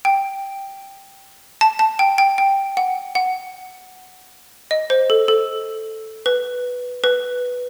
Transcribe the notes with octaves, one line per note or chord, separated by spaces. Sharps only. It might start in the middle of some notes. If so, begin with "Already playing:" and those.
G5
A5
A5
G5
G5
G5
F#5
F#5
D#5
C5
A4
A4
B4
B4